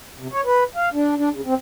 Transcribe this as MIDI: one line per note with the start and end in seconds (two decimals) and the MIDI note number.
0.18 0.28 48
0.32 0.41 73
0.45 0.64 71
0.76 0.89 77
0.94 1.15 62
1.17 1.29 62
1.34 1.41 49
1.46 1.54 60